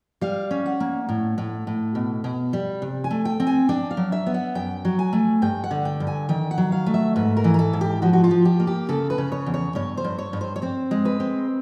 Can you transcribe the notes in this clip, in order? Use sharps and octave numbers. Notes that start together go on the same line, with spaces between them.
G3 F5
C#4
F#5
A#3
A2
A2
A2
B2
B2
G3
C3
G#5
A3
G5
C4
G#5
D4 G5
F5
F#3
E5
B3
F#5
F#2 G5
F#3
G#5
A3
G2 G5
F#5
D3
G5
G2
G#5
D#3 G5
F#5
F#3
F5
A3
E5
G#2 B4
A#4
E3
A#4
A4
G#2
G4
F3 F#4
F#4
F4
F3
G4
A#3
G4
C#3 A4
B4
C#3
C#5
E2
C#5
G2 C#5
C5
G2
C#5
G2
C5
C#5
C4 C5
G#3
B4
C4